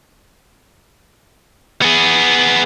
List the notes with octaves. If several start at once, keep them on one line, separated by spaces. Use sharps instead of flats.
B3 G#4